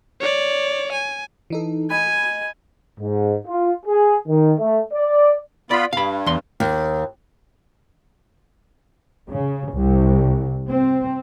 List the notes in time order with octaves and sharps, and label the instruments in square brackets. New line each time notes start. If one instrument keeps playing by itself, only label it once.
[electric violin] C#5 D5
G#5
[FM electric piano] E3 D#4 A4
[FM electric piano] D#5 B5 [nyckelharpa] G#5
[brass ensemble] G#2
F4
G#4
D#3
A3
D5
[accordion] B3 F4 B5 [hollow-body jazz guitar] D5
[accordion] G2 [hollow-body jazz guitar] F5 B5
[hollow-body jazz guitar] E2 C6
[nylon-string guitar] D#2
[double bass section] C#3
C2
C4